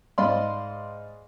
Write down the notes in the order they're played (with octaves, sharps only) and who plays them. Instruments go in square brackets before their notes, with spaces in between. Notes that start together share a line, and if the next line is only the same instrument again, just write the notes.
[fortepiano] G#2 D5 D#5 F5 B5 C6